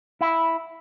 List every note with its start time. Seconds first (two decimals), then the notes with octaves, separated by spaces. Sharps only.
0.21 E4